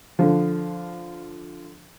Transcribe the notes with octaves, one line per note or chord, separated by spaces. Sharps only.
D3 F3